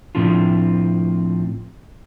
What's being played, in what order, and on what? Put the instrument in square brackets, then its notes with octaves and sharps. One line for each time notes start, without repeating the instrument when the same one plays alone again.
[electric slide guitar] A2 F3 C4 D4 F4